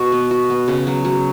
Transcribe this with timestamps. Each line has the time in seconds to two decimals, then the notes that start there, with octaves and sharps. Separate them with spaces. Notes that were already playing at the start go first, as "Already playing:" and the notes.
Already playing: B2 F#4
0.12 B3
0.31 F#4
0.50 B3
0.68 C#3
0.87 F#3
1.05 F#3